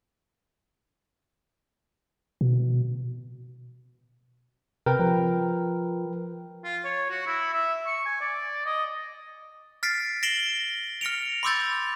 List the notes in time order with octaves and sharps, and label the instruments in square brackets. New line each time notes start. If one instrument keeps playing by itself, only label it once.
[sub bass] B2
[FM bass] C3 [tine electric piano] A#4 B4 G5
[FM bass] F3
[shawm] F4
C#5
F#4
E4
E5
C#6
G#5
D5
D#5
[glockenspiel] F6 A6 B6 C7 D7
A#6 C7 D7 E7 F#7 G7
F6 A#6 C#7 D7 F7
B5 C6 D6 E6 G6 A6